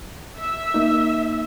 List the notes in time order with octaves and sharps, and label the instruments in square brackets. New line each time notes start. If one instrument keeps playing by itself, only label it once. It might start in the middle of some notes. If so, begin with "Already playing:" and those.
[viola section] E5
[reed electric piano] A#3 D#4